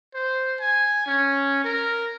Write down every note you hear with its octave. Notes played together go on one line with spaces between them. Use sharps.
C5
G#5
C#4
A#4